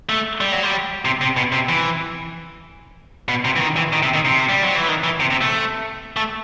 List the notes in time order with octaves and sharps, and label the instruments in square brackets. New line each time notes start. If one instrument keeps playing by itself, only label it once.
[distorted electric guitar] A3
G3
F#3
G3
C3
C3
B2
C3
E3
B2
C3
E3
D#3
E3
D#3
C3
D#3
C3
G3
F#3
E3
D#3
E3
C3
C3
A3
A3